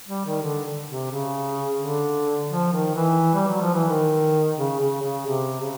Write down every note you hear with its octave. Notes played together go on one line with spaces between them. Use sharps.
G3
D#3
D3
C3
C#3
D3
F3
D#3
E3
G3
F#3
F3
E3
D#3
C#3
C#3
C#3
C3
C#3